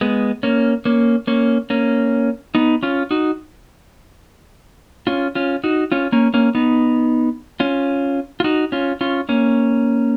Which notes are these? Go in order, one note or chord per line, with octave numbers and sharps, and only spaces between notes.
G#3 B3
A#3 C#4
A#3 C#4
A#3 C#4
A#3 C#4
B3 D#4
C#4 F4
D#4 F#4
C#4 F4
C#4 F4
D#4 F#4
C#4 F4
A#3 C#4
A#3 C#4
B3 D#4
C#4 F4
F4
D#4 F#4
C#4 F4
C#4 F4
A#3 C#4